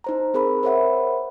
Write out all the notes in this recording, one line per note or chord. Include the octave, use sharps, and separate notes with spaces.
D#4 C5 A#5
C4 G#4 A#4 B5
A#4 C5 C#5 E5 F#5 B5